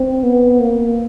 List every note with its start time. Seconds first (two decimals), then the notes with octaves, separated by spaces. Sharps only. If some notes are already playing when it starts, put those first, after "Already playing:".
Already playing: C4
0.24 B3
0.60 A#3